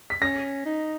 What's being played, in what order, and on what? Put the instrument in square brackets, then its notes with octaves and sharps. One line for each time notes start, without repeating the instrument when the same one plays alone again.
[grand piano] B6
[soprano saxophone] C#4 [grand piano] A#6
[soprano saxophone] D#4